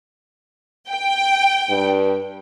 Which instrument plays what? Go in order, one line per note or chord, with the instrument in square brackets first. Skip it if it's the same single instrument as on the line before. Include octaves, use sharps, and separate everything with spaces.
[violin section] G5
[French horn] G2